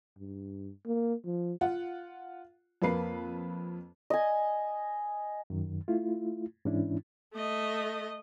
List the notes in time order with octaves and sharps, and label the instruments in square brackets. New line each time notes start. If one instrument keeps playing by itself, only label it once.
[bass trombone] G2
A#3
F3
[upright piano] F4 F#5
F2 A#3 B4 C7
[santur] D#5 G#5
[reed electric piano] F#2 D#3
A3 E4 F4
G#2 E3 C#4 D4 E4
[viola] A3 D#5